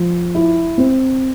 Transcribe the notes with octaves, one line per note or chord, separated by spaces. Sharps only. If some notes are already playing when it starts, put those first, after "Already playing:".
Already playing: F3
E4
C4